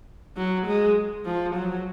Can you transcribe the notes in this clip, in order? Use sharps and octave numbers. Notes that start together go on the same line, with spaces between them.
F#3
G#3
F3
F#3